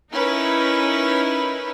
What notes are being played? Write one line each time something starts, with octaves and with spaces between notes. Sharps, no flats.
C#4 D#4 E4 A#4 B4